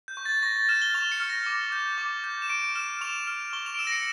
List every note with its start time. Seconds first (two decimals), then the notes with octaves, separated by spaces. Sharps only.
0.08 G6
0.17 C#6
0.26 A6
0.43 C#6 A#6
0.56 A6
0.69 F6 E7
0.82 G7
0.94 C#6 F7
1.12 C#7
1.20 F6
1.29 A#6
1.46 D6
1.72 G6
1.98 D6
2.24 G6
2.42 E7
2.49 C#6 D7
2.75 F6 E7
3.01 C#6 F7
3.27 F6
3.53 C#6 G7
3.66 F7
3.74 D7
3.79 E6 E7
3.87 A#6
3.92 C#7